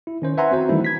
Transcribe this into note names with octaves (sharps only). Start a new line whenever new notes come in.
E4
D#3 C#4 C5
B4 E5 F#5 G#5 A#5 C6
C4 F#4 C5
D#3 E3 G3 A3 D#4 E4
G#6 B6